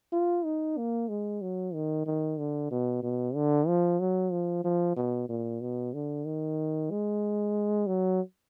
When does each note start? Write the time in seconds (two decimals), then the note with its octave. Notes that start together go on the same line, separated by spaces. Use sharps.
0.13 F4
0.45 D#4
0.78 A#3
1.09 G#3
1.42 F#3
1.74 D#3
2.07 D#3
2.39 D3
2.71 B2
3.03 B2
3.35 D3
3.68 F3
4.00 F#3
4.32 F3
4.65 F3
4.97 B2
5.29 A#2
5.61 B2
5.94 D3
6.26 D#3
6.91 G#3
7.87 F#3